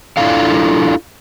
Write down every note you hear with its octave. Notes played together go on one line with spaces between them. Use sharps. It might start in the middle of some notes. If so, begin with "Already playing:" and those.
D4 E4 F4 A4 F5